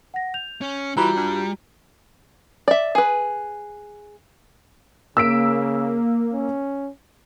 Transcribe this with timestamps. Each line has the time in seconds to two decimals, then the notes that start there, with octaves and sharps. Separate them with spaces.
0.14 F#5 A#6
0.34 G6 F7
0.61 C#4
0.97 E3 G3 F4 F#4 A#5
1.16 G2
2.68 D5 E5
2.95 G#4 B4
5.17 C#3 A#3 E6 B6 D7
6.33 C#4